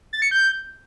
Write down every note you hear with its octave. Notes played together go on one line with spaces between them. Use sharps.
A6
C#7
G6